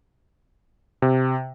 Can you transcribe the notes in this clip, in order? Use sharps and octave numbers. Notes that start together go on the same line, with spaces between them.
C3